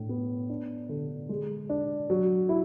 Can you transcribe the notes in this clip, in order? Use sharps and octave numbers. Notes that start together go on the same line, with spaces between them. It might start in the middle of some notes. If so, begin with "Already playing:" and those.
Already playing: A2 D4
B3
D4
D3
G#3
D4
F#3
E4